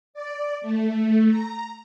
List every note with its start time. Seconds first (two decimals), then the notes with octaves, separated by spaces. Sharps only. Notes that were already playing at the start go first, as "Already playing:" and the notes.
0.14 D5
0.61 A3
1.28 A#5